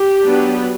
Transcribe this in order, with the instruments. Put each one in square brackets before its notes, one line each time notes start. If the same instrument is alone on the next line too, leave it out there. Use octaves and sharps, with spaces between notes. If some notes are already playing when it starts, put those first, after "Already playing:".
Already playing: [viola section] G4
F#3 B3 D4